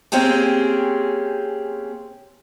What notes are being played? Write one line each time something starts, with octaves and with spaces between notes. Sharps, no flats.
A#3 C4 C#4 G4 G#4